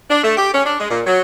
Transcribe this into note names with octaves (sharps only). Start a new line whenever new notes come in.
D4
A3
G4
C#4
D4
G#3
A#2
F#3